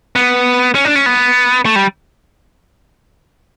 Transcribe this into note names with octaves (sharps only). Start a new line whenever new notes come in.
B3
C#4
D4
C#4
B3
A3
G3